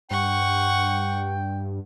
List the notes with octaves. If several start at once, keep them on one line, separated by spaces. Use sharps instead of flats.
G2 F#5 G5 C#6